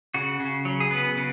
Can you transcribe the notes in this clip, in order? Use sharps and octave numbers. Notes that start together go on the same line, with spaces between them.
C#3 F#4
C#3
F#3
G#4
B3 B4
C#3